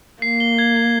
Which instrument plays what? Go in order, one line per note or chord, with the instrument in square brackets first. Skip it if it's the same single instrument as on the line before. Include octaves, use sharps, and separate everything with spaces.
[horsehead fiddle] A#3 [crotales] C7
[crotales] G7
G#6
G#6